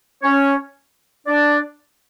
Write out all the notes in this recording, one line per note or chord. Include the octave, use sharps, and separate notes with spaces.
C#4 C#5
D4 D5